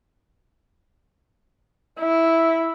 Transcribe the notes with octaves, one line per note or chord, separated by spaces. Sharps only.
E4